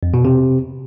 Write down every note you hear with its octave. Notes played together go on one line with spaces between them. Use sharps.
F2
B2
C3